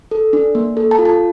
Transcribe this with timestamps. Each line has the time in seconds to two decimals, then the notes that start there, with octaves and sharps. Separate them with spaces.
0.11 A4
0.33 D4
0.55 A#3
0.77 A4
0.91 A5
0.99 F4
1.05 A5